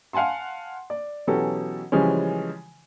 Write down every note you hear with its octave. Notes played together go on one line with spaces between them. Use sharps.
F5 F#5 G#5 A5 C6
D5
B2 E3 F#3 C#4 G4 A4
C#3 E3 F3 G3 G#3 C#4